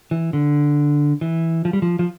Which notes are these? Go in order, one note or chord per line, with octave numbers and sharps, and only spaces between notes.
E3
D3
E3
F3
G3
F3
F3